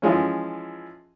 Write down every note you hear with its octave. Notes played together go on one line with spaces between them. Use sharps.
E3 F3 G#3 C#4